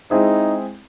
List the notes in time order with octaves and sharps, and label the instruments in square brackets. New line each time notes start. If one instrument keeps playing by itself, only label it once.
[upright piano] G#3 C4 E4 G#4 C5 [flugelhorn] D#4